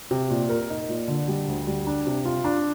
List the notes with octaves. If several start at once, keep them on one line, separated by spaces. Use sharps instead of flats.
C3
A#2
A#4
D#4
A#2
D3
G3
D2
G3
D4
C3
F4
D4